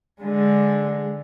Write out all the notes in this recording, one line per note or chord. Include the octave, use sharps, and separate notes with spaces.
D3 G#3